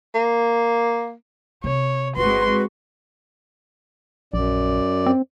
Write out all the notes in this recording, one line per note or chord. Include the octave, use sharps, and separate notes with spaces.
A#3
C3 C#5
G1 G#3 C4 F#4 B4 C6
A#1 F#2 D5
C4